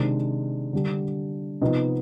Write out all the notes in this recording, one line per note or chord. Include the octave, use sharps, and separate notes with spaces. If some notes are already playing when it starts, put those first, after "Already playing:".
Already playing: C3 D#3 G#3 D4
D3 G3 D4
C3 F3 B3 D#4 D#5